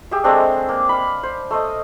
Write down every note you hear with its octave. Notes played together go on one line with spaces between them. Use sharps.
G4 G#4 E5
G#3 A3 C4 D4
A#3
F5 B5
C5
A3 C5 D#5